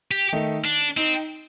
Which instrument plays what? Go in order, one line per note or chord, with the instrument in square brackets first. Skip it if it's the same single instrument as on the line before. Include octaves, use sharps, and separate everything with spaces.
[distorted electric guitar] G4
[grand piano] D#3 A3 D#4
[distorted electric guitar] D4
[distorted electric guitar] C4 [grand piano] D#4